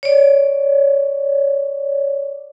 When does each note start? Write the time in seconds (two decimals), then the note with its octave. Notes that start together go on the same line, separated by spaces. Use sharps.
0.03 C#5 D5